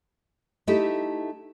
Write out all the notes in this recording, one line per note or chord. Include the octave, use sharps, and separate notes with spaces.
A3 D#4 E4 G4